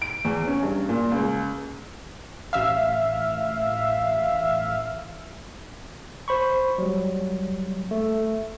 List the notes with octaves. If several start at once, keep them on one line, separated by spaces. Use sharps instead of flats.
D7
E2
C#4
G2
A#2
C#2
A1 E5 F5
C5 B5 C#6
F#3 G3
A3